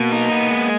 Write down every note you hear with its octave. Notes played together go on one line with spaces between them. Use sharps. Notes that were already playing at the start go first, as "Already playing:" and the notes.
Already playing: B2 A#3
D#4
B3
G#3